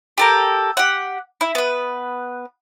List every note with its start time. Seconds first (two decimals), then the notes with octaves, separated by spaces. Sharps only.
0.18 G4 A4 A#4
0.77 G4 F#5
1.41 E4
1.55 B3 B4